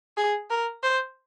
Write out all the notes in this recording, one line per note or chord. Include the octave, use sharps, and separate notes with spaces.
G#4
A#4
C5